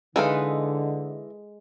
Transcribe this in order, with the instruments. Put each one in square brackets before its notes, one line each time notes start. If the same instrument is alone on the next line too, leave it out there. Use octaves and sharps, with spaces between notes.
[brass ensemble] D3 [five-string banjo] E3 D#4 F5 [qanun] G#3 A4 B4